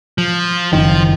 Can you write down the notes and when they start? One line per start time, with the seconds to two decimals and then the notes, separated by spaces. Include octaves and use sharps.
0.18 F3
0.73 F#1 D#3 F3